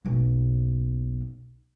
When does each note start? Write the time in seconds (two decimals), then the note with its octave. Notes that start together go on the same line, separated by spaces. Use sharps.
0.05 F#1 B1